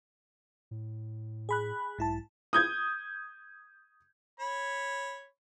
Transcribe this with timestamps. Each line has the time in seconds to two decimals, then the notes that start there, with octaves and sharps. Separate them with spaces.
0.71 A2
1.49 G#4 B5 F#6
1.98 B1 G#2 E4 A5
2.53 D#6 G6 G#6
4.40 C#5 B5